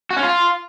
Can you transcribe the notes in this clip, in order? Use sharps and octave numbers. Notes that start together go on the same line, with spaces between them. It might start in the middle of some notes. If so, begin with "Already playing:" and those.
F#4
C#4
F4